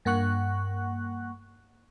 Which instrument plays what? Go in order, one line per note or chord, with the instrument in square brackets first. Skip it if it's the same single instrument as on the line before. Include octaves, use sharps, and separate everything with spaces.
[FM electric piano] G2 A#3 F#5 C#6 F#6